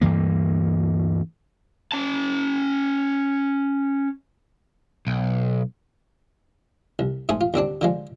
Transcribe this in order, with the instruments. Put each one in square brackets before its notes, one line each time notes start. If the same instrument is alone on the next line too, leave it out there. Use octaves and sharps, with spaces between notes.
[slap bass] D2 G2 E3 A#3
[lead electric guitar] C#4 A5
[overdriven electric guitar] B1
[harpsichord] C2
G#2 A3 G#4 C6
F4
D#2 D3 C4 D4
D3 F3 G#3